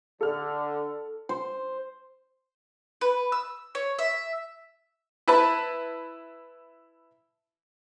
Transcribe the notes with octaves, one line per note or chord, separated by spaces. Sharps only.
D3 A4 F6
C5
B4
E6
C#5
E5
E4 B4 A5 B5